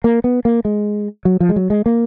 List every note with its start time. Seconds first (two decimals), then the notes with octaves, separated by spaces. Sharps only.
0.04 A#3
0.24 B3
0.45 A#3
0.65 G#3
1.25 F#3
1.40 F3
1.49 G#3
1.56 F#3
1.70 G#3
1.86 A#3